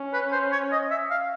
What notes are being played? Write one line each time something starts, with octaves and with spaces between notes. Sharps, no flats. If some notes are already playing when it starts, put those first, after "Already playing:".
Already playing: C#4
B4
C5
C#5
D#5
E5
F5